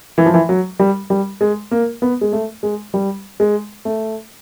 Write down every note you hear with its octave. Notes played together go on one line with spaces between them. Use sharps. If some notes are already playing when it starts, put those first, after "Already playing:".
E3
F3
E3
F#3
G3
G3
G#3
A#3
B3
G#3
A3
G#3
G3
G#3
A3